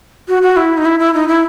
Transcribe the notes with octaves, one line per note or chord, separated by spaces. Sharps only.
F#4
F#4
E4
D#4
E4
E4
D#4
E4